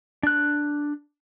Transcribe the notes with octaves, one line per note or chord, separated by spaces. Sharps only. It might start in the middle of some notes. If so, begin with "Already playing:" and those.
D4 F#6